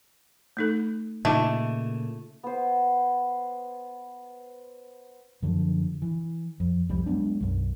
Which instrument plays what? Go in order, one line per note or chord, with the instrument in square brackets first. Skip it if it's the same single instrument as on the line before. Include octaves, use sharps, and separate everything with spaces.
[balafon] A3 D#4 A4
[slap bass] A#2 C#3 [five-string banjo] A3 [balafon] D#4 F4 D#5
[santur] B3 C5
[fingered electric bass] F#2 D3 F3
E3
F2
C2 F2 G3
F#3 G#3 B3 D4
B1 F#2